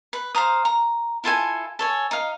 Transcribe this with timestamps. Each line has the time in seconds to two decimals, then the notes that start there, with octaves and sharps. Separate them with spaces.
0.13 B4
0.35 C5 F5 A#5 D#6
0.65 A#5
1.24 E4 F4 A4 G#5
1.79 A4 C#5 G#5
2.11 D#4 F5